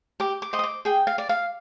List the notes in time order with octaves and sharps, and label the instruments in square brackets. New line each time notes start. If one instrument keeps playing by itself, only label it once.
[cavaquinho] G4 D6
D6
C5 D#5
D#6
D6
G#4 G5
F5
D5
F5